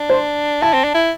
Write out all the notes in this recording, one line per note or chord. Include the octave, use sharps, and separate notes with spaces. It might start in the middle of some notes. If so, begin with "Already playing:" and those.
Already playing: D4
C5
E4 A5
C4
D4
E4